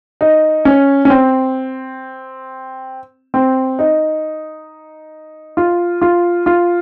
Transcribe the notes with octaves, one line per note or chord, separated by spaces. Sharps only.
D#4
C#4
C#4
C4
C4
D#4
F4
F4
F4